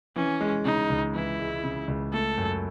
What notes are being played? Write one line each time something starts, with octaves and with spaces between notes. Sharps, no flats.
E3 C#4
G#3
C#3 D#4
C#2
E3 E4
G#3
C#3
C#2
A3 A4
F#2